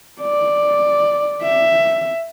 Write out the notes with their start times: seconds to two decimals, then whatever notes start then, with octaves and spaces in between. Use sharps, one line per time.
0.21 D5
1.43 E5